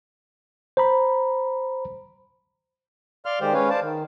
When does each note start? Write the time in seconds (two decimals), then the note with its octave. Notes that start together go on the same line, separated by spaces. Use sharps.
0.77 C5 A#5 B5
3.26 D5 F5 C6 F6
3.41 D#3 G#3 G4 C5 D5
3.54 G#3 C#4 B4 C#5 F5
3.70 C5 D5 F5 A5
3.82 D#3